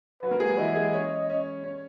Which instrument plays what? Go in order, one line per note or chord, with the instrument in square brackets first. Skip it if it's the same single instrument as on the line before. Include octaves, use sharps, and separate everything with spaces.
[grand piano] F#3 F#4 [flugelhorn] B4
[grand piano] A#3 A#4
G#3 G#4
F#3 F#4
[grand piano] E3 E4 [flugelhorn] D#5
[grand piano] G#3 G#4
C#4 C#5
C#4 C#5
C#4 C#5